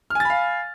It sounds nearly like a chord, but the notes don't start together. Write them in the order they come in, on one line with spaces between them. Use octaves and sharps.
F6 G#5 A6 B5 F5